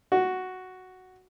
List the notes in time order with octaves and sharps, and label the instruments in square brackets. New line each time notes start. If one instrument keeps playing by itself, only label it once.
[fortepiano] F#4